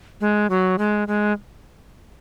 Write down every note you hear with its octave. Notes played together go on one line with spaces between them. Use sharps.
G#3
F#3
G#3
G#3